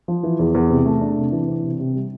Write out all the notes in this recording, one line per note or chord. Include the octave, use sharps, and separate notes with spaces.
F3
E3
E2
E2
C3
A3
D4
C3
E3
C4
C3
C3
G3